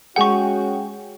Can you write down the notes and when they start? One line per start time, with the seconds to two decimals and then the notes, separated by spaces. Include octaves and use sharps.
0.16 G#3 C#4 F#4 G#4 F#5 G5 C#6